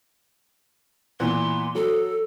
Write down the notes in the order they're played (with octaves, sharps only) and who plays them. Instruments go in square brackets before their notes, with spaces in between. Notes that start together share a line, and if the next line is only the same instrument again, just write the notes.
[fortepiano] A#2 E3 B3 [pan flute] C6
[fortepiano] F#3 [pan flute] A4